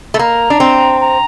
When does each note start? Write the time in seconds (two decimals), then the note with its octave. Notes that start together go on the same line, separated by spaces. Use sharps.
0.14 A3
0.19 A#3 A#5
0.50 D4
0.60 C4
1.01 A#5